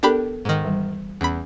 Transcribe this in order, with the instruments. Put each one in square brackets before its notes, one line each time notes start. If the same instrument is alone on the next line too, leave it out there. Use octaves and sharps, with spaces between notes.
[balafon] B3 A4 A#4 [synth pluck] D4 G4 B5
[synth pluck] G#2 D#3
[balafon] E3 G3
[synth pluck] E2 B5 [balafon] C#4